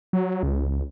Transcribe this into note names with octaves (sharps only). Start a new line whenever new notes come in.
F#3
C#2